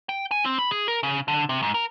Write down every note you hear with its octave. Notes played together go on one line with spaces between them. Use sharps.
G5
G#5
C4
B5
G#4
A#4
C#3
D3
C3
G#2
A#4